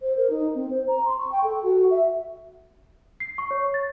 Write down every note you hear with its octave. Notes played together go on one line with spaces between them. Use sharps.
C5
A#4
D#4
C4
C5
A#5
C6
C#6
G5
A4
F#4
E5
C7
C#6
C#5
A6